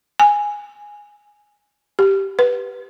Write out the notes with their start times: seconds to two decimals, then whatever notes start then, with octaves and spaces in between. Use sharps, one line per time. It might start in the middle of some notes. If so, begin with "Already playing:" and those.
0.20 G#5
1.99 G4
2.39 B4